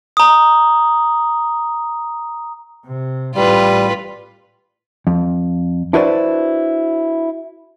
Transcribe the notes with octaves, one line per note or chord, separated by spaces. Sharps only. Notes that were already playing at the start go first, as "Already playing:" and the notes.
A#5 D#6
C3
A1 A2 G3 F4 B4
F2
D4 E4 F#4 B4 C5 D5